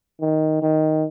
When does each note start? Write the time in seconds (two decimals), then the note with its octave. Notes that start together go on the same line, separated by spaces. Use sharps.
0.21 D#3
0.62 D#3